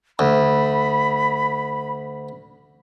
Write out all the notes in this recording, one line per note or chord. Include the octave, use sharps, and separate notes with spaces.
D2 B5